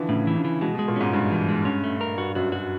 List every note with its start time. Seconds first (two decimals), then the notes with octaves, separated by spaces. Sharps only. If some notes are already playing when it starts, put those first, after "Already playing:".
Already playing: D3 E3 F3
0.09 A2 C#3
0.27 E3
0.35 C#3
0.45 E3
0.61 B2 G#3
0.75 B2 G#3
0.88 A#2
0.96 G#2 C#4
1.13 G2 G#3
1.32 E3
1.49 G#3
1.65 C#4
1.84 A3
2.01 A#4
2.18 G2 F#4
2.35 F#2 F#4
2.52 F#2 F#4